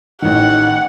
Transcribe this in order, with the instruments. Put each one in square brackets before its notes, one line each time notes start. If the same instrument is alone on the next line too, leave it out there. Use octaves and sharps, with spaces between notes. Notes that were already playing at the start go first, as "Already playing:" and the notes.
[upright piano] A1 D#3 [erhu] F#5